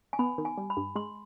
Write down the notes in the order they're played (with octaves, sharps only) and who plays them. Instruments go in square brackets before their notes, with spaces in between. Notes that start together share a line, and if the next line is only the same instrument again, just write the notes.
[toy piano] G#5
[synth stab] B3 [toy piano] B5
[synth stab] D#3
[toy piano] G#5
[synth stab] G3
[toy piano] B5
[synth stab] G2
[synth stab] G#3 [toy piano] C6